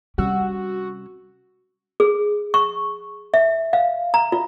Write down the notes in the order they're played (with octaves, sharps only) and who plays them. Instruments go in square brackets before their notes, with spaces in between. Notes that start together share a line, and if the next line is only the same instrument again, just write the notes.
[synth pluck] C3 G3 E6 [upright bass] C#4 [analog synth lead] F#4
[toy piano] G#4
C#6
E5
F5
A#5
F4